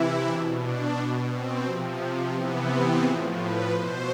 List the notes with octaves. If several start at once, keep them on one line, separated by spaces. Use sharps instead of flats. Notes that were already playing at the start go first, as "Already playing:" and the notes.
Already playing: C3 E3 E4
B2 D4
D4
B2
C4
C3 F3
C3 E3 B3
C4
A2 F3 G#4
B4
B2 C5